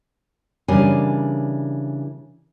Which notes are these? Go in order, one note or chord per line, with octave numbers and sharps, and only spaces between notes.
C#3 E3 G3 D4 A#4 G#5